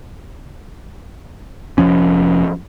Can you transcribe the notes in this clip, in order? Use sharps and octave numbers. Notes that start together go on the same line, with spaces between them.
F1 F#2 F3 C#4